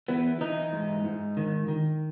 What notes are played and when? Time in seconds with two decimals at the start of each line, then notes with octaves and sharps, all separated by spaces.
0.08 E3 B3
0.41 E3 D#4
0.73 G#2
1.04 G#2
1.37 D#3
1.68 D#3